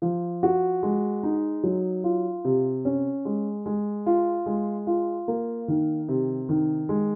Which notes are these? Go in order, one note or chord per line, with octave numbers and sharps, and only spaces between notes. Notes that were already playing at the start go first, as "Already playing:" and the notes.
F3
F#4
G#3
D#4
F#3
F4
C3
C#4
G#3
G#3
F4
G#3
F4
A#3
D#3
C3
D#3
G#3